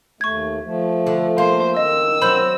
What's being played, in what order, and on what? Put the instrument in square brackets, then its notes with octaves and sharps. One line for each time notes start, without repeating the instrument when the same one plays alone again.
[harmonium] D#2 A3 [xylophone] C#6 G#6
[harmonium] F3 A3
[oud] D3
[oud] A#3 [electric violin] C5 [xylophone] F5
[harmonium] D#3 [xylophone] D#5 [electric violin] E6
[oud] F#3 C4 [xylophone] B5 G6 E7